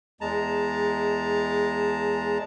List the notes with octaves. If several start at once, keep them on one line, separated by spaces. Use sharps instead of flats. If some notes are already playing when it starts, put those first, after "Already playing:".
E2 G#3 A5 A#5